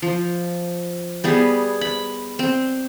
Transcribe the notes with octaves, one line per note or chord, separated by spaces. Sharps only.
F3
G3 B3 G#4
B5
C4